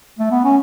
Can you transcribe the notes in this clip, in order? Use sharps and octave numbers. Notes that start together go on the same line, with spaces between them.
A3
B3
C#4